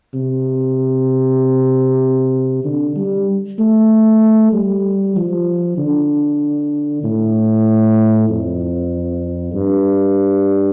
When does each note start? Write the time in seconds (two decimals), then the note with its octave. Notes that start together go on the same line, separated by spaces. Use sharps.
0.14 C3
2.65 D3
2.96 G3
3.59 A3
4.53 G3
5.16 F3
5.78 D3
7.04 A2
8.29 F2
9.54 G2